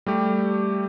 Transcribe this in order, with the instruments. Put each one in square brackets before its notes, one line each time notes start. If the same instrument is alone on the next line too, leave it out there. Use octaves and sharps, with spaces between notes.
[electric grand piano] G3 A3 G4